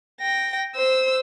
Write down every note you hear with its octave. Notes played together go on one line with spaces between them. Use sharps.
G5 A#6
C5 E6